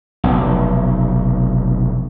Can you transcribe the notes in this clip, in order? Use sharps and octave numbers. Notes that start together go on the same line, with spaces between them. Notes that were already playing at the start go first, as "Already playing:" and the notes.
F1 B1